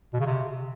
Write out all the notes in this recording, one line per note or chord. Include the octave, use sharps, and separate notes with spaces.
B2
C#3
C3